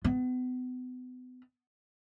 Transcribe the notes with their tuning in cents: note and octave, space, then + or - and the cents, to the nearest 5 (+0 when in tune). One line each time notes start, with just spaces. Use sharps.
B3 +35